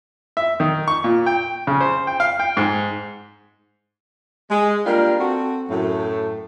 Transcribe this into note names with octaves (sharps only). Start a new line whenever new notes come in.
E5
D#3
C#6
A#2
G5
C#3
C5
G5
F5
G5
G#2
G#3
G3 A#3 D4 F4 A#4 G5
C4 F#4 A4
F#2 A2 A3